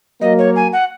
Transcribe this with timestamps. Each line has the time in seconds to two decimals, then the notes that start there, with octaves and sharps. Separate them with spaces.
0.21 F#3 A#3 D#5
0.38 C#5
0.56 G#5
0.73 F#5